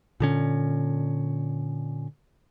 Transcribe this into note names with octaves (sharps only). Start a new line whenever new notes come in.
A#2 D3 C#4